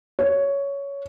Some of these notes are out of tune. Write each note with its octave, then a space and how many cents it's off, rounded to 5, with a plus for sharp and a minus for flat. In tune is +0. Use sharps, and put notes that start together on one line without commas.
C#5 +10